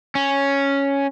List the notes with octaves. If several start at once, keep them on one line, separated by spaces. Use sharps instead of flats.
C#4